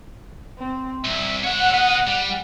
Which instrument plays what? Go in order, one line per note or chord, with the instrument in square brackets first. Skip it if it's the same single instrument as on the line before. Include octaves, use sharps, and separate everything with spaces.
[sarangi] C4
[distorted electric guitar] C2 [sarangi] E5
[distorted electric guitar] C#5 E5 [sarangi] F#5
[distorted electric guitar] B3 D#5
G3